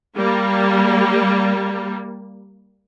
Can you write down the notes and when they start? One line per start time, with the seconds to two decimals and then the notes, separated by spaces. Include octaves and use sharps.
0.15 G3 A#3